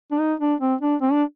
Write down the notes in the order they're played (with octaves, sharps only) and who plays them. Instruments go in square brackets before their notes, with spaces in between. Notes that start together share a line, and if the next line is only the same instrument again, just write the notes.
[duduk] D4
D#4
D4
C4
D4
C4
D4